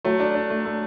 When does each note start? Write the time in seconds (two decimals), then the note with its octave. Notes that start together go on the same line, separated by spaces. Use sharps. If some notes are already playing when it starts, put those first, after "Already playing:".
0.05 F#3 A3
0.20 D4
0.35 D4
0.50 A3
0.65 A3